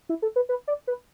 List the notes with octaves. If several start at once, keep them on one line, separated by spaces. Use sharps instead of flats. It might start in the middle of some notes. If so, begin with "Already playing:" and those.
E4
A4
B4
B4
D5
B4